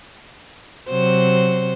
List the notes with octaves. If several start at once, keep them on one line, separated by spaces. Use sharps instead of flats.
C3 F#3 C5